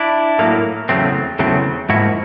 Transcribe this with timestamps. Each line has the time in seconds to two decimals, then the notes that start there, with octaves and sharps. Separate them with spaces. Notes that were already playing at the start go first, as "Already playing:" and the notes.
Already playing: D4 E4
0.39 A2 F#3 A#3
0.89 E2 C#3 F#3 A3 C4
1.39 E2 C#3 F#3 A3 C4
1.89 G#2 F3 A#3 E4 F#4